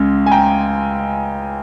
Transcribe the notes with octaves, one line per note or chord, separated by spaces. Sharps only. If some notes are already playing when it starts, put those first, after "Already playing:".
Already playing: C#2 C#3 G#3
G#5
G5 A#5